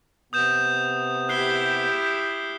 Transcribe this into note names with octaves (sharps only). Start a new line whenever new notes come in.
C3 B3 D#6 G6 E7
E4 G4 F#6 C7 G7